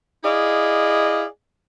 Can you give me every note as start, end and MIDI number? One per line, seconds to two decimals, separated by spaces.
0.24 1.25 64
0.24 1.25 68
0.24 1.25 74
0.24 1.25 75
0.24 1.25 77